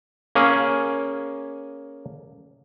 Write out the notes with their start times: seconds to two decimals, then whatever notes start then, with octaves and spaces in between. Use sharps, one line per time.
0.35 A#3 C#4 G#4